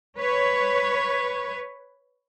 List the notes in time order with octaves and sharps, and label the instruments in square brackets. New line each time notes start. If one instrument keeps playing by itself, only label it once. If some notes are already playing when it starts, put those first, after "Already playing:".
[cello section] B4 C#5